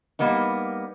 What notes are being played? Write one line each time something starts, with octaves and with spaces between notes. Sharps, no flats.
G3 A#3 B3 D#4